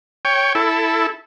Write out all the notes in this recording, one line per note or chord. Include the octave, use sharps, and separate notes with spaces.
C#5 G5
E4 A4